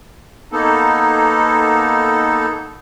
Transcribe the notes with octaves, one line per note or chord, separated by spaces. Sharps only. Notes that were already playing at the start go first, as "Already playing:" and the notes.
A#3 B3 D#4 A4